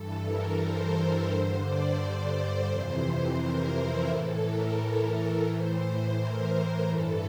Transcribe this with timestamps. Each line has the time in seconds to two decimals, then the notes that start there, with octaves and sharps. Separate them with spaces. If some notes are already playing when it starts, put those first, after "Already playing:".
Already playing: G2 E3 A4
0.25 A#4
0.61 C5
0.94 C5
1.29 G2 D3 C5
1.64 D5
2.00 D5
2.34 C5
2.69 F2 C3 E3 C5
3.04 C5
3.39 A#4
3.73 E4
4.08 A2 E3 A4
4.43 A#4
4.78 A4
5.13 A#4
5.48 A2 E3 C5
6.17 A#4
6.53 A#4
6.87 G2 E3 A4